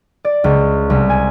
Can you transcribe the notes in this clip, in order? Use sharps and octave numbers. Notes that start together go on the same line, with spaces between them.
D5
C#2
C2
G#5